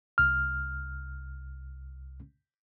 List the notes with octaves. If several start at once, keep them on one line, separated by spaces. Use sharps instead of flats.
C2 F6